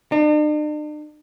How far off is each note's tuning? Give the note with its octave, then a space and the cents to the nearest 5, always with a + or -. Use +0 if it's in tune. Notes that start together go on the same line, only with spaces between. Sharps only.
D4 +45